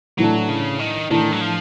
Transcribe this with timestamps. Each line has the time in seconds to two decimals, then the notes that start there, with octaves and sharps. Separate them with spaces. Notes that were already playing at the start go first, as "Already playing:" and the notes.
0.18 A2 E3 F#3 A3 D4
0.49 C#3
0.79 D#3
1.10 A2 D#3 E3 A3 D4
1.32 F#3
1.41 F3